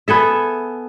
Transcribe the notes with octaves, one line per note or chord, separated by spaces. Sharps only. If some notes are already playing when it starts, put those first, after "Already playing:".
B3 G#4 A4 E5